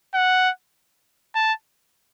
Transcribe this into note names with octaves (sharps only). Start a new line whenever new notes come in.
F#5
A5